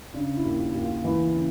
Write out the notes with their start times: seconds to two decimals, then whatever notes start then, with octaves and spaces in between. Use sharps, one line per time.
0.14 C#3 D4
0.37 E4
0.45 D#2
0.60 F4
0.75 D#2
0.82 F4
1.04 E3 E4
1.34 C#3